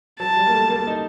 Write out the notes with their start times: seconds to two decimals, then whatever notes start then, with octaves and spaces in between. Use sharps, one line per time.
0.20 F#3 A5
0.37 G3
0.47 A#3
0.54 A3
0.70 A#3
0.87 D#4